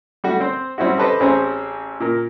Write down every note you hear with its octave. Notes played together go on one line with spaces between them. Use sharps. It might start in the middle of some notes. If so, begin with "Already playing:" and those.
G3 A3 F#4
C4 C5
G3 C4 C#4 E4 F#4
G4 A4 B4 C5 D#5
A1 C4 C#4 G#4 C5 A#5
A#2 A#4